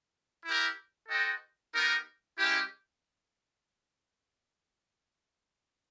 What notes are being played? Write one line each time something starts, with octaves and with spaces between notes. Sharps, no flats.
E4 G4 A#4
F#4 A4 C5 D#5 G5
B3 D#4 G4 A#4
G#3 C#4 E4 G4